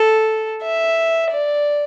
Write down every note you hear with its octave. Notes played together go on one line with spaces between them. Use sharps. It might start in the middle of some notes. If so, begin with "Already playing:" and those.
Already playing: A4
E5
D5